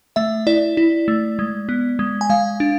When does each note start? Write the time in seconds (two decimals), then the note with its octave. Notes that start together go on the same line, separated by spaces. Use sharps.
0.16 A3 E5
0.47 E4 D5
0.77 E4
1.08 A3
1.39 G#3
1.69 B3
1.99 G#3
2.21 G#5
2.30 G#3 F5
2.60 D4